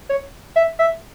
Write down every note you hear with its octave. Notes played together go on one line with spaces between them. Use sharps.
C#5
E5
E5